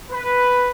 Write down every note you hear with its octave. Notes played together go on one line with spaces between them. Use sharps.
B4